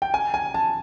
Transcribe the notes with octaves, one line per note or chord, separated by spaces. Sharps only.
G5
G#5
G#5
A5